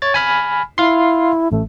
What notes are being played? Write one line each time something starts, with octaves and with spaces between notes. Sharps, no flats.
C#5 A6
G#5 B5 F6
E4 F5 C6
A1 A3